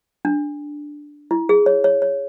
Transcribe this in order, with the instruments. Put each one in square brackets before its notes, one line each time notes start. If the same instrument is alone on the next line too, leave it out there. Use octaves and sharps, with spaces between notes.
[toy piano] D4
E4
G#4
C#5
C#5
C#5